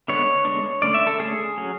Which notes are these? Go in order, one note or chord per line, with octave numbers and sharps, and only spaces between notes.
D3 G#3 B3 D4 C#5
D3 G#3 B3 D4
D3 A3 C#4 D5
E5
A4
D3 A3 C#4 G#4
F#3 C#4